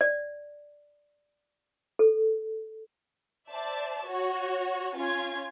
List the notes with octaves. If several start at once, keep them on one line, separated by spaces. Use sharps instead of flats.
D5
A4
C5 D5 E5 A5
F#4 C#5
C#4 F4 G#6